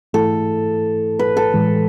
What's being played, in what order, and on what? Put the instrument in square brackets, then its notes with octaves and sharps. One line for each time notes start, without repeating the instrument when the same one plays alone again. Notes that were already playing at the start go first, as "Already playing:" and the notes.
[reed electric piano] G#2 E3 A3 E4 [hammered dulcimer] A4
[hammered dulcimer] B4
A4
[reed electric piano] A2 E3 G#3